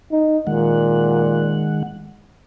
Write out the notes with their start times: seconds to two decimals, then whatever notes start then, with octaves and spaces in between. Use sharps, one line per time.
0.12 D#4
0.47 A#2 D#3 G#3 F#5